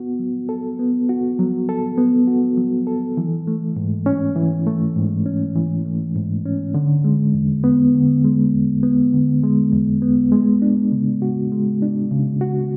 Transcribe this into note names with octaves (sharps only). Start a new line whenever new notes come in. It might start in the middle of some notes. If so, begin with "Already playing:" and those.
Already playing: B3 F#4
F#3
A4
B3
F#4
F#3
A4
B3
F#4
F#3
A4
E3
A3
G#2
C#4
E3
A3
G#2
C#4
E3
A3
G#2
C#4
D3
G#3
E2
B3
D3
G#3
E2
B3
D3
G#3
E2
B3
G#3
D4
C#3
F#4
G#3
D4
C#3
F#4